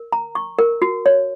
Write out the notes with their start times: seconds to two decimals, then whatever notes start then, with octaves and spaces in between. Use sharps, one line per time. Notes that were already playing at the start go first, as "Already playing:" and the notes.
Already playing: A#4
0.12 A#5
0.35 C#6
0.59 A#4
0.82 F#4
1.06 C#5